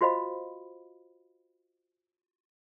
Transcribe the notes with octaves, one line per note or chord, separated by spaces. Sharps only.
F4 F#4 C5 D#5 F5 B5